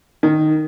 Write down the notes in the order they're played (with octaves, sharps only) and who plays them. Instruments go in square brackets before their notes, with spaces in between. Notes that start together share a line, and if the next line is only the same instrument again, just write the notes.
[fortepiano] D#3